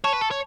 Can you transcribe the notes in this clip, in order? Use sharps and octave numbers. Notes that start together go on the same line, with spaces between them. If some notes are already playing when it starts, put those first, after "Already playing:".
C#5 A5 C#6
B4
A4
C#5